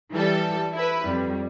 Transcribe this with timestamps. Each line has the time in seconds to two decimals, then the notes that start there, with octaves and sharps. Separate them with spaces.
0.12 E3 G3 A4
0.73 E4 B4
1.05 F2 G3